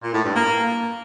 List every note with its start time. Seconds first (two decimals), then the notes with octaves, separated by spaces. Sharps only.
0.03 A#2
0.14 A2
0.25 G2
0.36 A#3